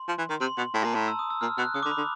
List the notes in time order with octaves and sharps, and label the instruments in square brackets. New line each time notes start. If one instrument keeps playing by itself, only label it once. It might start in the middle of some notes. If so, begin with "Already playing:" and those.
Already playing: [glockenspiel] C6
[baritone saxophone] F3
E3
D#3
[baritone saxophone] C3 [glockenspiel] C6
[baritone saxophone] B2
[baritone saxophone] A2 [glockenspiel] C6
[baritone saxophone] A#2 [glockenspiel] A5
[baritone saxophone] A2 [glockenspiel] A#5
[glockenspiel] E6
D#6
E6
[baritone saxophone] A#2 [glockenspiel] F6
[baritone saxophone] B2 [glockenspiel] F#6
[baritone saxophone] C#3 [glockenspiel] D#6
[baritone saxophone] D3 [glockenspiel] D6
[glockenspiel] B5
[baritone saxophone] D3